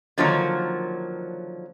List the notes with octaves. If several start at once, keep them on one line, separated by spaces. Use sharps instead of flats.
D3 D#3 F3 F#3 A#3 C#5